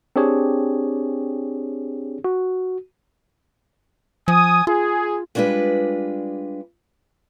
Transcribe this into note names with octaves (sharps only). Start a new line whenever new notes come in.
C4 D4 G4 G#4 C#5
F#4
F3 G#5 D#6
F4 G#4
G3 G#3 D4 F4 B4